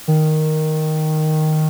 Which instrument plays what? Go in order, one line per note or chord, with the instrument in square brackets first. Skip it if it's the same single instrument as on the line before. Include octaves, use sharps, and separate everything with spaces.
[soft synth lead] D#3